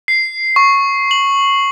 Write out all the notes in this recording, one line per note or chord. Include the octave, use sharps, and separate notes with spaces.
C7
C#6
F#7